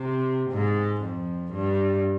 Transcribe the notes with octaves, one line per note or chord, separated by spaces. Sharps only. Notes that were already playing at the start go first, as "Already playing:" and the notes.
Already playing: C3
G#2
F2
G2